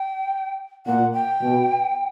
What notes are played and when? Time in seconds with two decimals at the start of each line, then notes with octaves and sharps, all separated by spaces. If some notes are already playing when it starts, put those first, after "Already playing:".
Already playing: G5
0.86 A#2 F#5
1.13 G5
1.41 B2